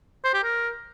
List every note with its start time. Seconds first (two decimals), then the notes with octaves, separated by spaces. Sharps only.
0.24 C5
0.34 G4
0.44 A#4